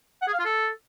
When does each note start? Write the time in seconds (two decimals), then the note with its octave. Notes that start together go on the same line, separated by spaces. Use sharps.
0.22 F#5
0.28 G#4
0.33 F5
0.39 F4
0.45 A4